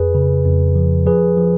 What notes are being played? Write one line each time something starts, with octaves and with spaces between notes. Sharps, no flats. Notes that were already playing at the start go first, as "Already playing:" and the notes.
Already playing: F2 G#4 B4
C#3
F2
F3
F3 G#4 B4
F3